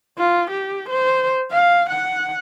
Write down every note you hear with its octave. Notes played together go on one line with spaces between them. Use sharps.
F4
G4
C5
F5
F#5